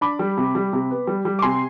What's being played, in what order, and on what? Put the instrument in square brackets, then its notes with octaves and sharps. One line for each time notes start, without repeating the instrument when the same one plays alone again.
[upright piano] D4 B5 D6
G3
C3
G3
C3
B3
G3
G3
D6
C3 G#5 C6